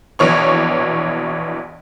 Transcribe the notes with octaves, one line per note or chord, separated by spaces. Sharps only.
A#1 B2 E3 C#5 C#6